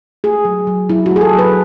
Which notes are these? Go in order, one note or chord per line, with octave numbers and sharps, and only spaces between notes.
A3 G#4
F#3
F#3
F#3 E4
F#4
A3 G#4
A4
F#3
B4